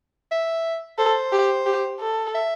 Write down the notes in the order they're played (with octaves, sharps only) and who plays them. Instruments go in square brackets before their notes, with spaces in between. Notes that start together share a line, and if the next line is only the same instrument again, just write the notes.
[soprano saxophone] E5
[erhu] A4 [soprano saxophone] C5
[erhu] G4
G4
A4
[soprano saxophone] E5